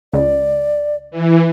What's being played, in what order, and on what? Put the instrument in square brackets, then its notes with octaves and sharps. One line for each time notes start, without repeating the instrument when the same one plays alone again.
[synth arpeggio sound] C#2 [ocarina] D5
[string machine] E3